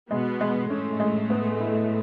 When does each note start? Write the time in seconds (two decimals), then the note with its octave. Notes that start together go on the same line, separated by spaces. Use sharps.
0.11 B2 G#3 B3
0.41 G#3
0.70 A2 A3 C#4
1.00 G#3
1.30 B3
1.60 E4